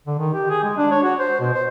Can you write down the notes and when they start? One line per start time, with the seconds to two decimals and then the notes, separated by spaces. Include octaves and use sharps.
0.06 D3
0.18 D#3
0.34 G4
0.50 G#4
0.63 G#3
0.77 D4
0.91 C#5
1.03 F#4
1.19 C5
1.40 B2
1.53 C5